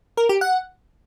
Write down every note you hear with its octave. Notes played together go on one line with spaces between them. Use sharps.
A#4
G4
F#5